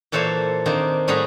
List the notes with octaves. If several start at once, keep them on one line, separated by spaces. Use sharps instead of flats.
A#2 E3 A4 C5 C#5 E5
D#3 A#3 C4 D4
A2 G3 G#4 F#5 A#5 B5